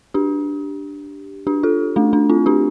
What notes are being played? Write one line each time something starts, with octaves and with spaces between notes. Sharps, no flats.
D4 G4
D4 G4
F4 A4
A3 D4
A3 D4
C4 F4
D4 G4